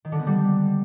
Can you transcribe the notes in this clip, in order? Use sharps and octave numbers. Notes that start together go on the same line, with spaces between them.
D#3
D3
B3
G3